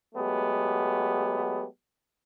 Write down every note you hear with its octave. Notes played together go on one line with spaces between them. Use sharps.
F#3 G#3 A3 B3 G4